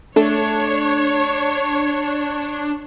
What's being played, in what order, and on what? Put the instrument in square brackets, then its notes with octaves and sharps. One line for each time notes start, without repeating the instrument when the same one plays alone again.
[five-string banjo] A3 A4 [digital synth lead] D4 [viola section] C#5